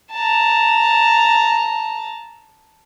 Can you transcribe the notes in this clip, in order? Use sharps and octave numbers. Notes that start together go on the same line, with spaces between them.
A5 A#5